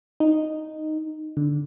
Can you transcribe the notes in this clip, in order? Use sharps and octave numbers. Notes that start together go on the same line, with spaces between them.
D#4
D3